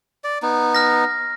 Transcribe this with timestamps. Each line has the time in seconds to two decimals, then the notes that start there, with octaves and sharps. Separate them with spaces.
0.24 D5
0.42 B3 D#4
0.75 F6 A#6